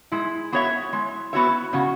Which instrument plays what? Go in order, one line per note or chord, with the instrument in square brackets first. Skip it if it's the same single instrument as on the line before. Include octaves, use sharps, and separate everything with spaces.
[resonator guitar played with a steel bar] G#3 [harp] E4 G#4
[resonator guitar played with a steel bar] B3 F#4 C#5 E5
G#3
B3 F#4 C#5 E5
[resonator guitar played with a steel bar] C#3 [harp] C#4 F#4